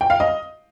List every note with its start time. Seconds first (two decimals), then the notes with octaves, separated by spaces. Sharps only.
0.01 G5
0.10 F5
0.20 D#5